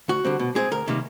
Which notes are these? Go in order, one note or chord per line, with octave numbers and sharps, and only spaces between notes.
D2 F#4
D3 G3 C4
B2
G#3 C4 G#4
D2 A#4
C3 D#3 G3 A#3